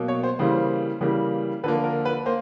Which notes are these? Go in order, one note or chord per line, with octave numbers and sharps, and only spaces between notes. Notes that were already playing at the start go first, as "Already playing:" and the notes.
Already playing: B2 F#3 A#3
C#5
C5
C#3 E3 G3 A#3 C5
C#3 E3 G3 A#3
D3 F3 A#3 B4
A#4
B4
A#3 C5